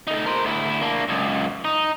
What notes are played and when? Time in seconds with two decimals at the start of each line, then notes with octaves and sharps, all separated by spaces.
0.07 A3 D#4
0.26 A#4 C5
0.45 D2 E4
0.81 A#3 D4
1.09 C#2 F#2
1.65 D#4